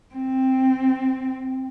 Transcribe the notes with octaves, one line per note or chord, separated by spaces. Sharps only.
C4